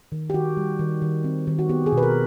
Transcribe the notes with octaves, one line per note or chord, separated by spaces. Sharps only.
D#3
G4
D#3 F#4
G3
D#3
D#3
C4
D#3
F#4
B3 G4
G#4
B2
B4
A#4